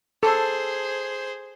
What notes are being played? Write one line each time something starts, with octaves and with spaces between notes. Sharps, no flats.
G#4 A4 C5